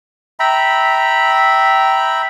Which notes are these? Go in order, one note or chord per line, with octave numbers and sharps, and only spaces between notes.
E5 G5 A#5 B5